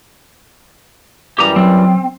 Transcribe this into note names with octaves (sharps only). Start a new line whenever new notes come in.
F#2 E3 G3 G4 A#5
F#3 C4